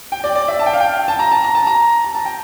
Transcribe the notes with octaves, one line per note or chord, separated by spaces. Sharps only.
G5
D5
D5
E5
A5
G5
F5
G5
A5
A#5
A5
A#5
A5
A#5
A#5
A5
G5